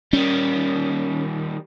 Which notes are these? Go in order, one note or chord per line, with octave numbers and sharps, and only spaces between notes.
D#3 G3 C#4